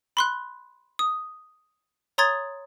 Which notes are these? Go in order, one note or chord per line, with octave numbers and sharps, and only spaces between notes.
B5 C6 F#6
D#6
C#5 A#5 C6 D#6 G#6 A6